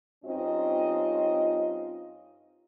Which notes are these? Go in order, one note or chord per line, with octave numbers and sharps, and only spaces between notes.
G2 C4 C#4 D#4 F4 D#5